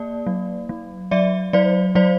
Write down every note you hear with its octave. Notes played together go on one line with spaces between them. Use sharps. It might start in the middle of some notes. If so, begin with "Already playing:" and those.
Already playing: A#3 D5
F#3
F#3
F#3 D5 E5
F#3 C5 D5
F#3 C5 D5